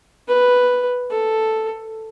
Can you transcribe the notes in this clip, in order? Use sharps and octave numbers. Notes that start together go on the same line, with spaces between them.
B4
A4